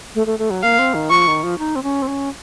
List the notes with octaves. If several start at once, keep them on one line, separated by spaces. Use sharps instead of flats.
A3
A3
A3
F#3
A#3 F5
C4
D#3
F3 C#6
D#3
F3
D#4
C4
C#4
C4
C#4